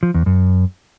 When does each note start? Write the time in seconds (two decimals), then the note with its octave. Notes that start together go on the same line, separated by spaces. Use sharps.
0.03 F3
0.14 E2
0.26 F#2